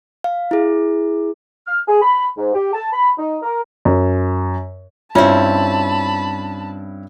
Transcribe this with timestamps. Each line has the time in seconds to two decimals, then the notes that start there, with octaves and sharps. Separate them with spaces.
0.24 F5
0.51 E4 G#4
1.67 F6
1.88 G#4
2.02 B5
2.37 G#2
2.54 G4
2.73 A5
2.93 B5
3.18 D#4
3.43 A#4
3.85 F#2
5.15 G2 C4 C#4 E4 F4 C#5 A5 B5